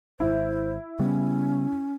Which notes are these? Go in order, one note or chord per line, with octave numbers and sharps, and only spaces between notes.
G#1 E4 C5
C#3 G3 B3 C#4